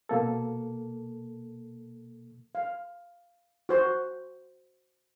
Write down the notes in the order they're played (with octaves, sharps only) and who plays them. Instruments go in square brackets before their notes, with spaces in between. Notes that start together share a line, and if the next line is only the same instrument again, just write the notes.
[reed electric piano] B2 A#3 A4
[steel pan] F5
F#4 C5